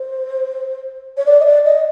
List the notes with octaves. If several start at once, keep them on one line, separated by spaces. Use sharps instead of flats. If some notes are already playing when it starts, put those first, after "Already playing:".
Already playing: C5
C#5
D5
D#5
D5
D#5